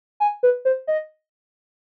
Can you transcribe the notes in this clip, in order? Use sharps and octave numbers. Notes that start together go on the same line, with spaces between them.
G#5
B4
C5
D#5